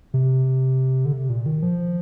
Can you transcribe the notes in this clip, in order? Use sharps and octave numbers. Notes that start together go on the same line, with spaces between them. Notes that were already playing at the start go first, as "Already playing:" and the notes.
C3
D3
C3
A#2
D#3
F3